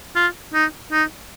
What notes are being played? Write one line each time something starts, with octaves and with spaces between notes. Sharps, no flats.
F4
D#4
D#4